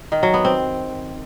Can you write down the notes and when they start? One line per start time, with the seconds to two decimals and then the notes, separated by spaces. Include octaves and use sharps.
0.12 D#3
0.23 F#3
0.34 B3
0.45 C4